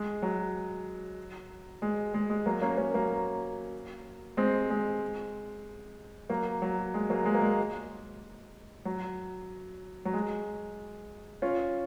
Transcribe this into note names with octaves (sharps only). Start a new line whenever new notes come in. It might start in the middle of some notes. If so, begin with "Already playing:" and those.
Already playing: G#3
F#3
G#3
G#3
G#3
F#3 A#3
A#3 C#4
A#3 C#4
F#3 A#3
G#3 C4
G#3
F#3 A#3
F#3
G#3
F#3 A#3
G#3
A#3
G#3
F#3
F#3
G#3
C#4 F4